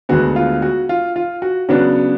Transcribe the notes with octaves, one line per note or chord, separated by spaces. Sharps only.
D2 D3 G#3 B3 F#4
F4
F#4
F4
F4
F#4
C#3 F#3 B3 D4 F#4